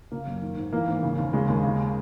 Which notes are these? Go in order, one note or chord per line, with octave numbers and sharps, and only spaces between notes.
C#3 A#3
F#2
D#3
G#2
E3 A#3
G#2
C#3
D#2
C#3 G#3
D#2
C#3